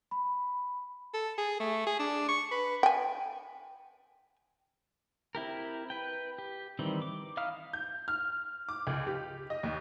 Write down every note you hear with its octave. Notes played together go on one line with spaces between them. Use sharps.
B5
A4
G#4
A3
G#4
D4
C#6
B4
G5 G#5
C4 E4 G4 A#4
B4 G5
G4
D#3 E3 G3 C4
D6
D#4 E4 F5 D#6 F6
G6
F6
D6
C#2
G4
D#5
D#2